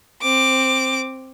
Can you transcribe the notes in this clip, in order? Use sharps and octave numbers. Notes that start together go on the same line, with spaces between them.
C4 D6